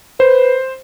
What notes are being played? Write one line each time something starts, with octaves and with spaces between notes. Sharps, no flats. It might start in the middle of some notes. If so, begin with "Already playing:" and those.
B4 C5